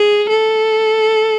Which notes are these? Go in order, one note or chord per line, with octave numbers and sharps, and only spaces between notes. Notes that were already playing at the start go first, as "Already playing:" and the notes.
Already playing: G#4
A4